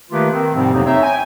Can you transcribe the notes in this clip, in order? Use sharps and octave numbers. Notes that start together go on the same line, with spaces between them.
D#3 A3 A#3 F4 G4 B4
D#3 C4
G#2 C3 F3 G3 C4
F2 C3 F#3 A#3 B3 D#4
C4 D#4 C#5 E5
G5 G#5